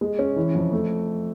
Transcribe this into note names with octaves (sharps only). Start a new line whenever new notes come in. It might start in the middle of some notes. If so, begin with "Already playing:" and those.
G#3
C#4
E3
F2
A3